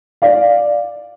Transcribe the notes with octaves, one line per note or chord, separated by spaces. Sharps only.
D5 F5